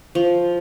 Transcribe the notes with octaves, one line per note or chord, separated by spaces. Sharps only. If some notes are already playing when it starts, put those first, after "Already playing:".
F3